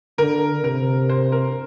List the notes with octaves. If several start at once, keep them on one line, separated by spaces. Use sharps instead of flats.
D3 A#4
C3 A#4
C5
A#4